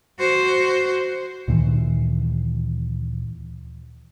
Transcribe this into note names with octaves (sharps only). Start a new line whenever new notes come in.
F#4 C5
D2 A#2 D#3 E3